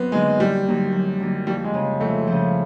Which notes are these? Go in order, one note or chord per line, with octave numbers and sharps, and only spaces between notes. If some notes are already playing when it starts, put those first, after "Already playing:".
Already playing: F#2 B3 C4
D3 F#3 G#3 A#3 D#4
F#2 G3
D3 F#3 A#3 D#4
F#2
D3 F#3 A#3 D#4
F2 G3
G#3
C#3 F3
F2 A3
C#3 F3